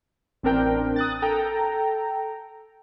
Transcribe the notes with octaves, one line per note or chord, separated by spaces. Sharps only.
A1 C4 D4 A#4 G5
D#6 F#6 A6
A4 G5 A#5